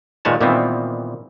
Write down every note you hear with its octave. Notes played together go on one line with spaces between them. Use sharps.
A#2 D#3 G#3 B4 C#5 A5
A#2 D#3 E3 G3 B3 C4